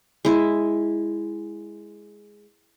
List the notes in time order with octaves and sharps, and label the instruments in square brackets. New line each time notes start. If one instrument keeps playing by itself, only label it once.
[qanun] G#3 E4